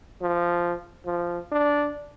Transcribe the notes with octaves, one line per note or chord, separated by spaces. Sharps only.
F3
F3
D4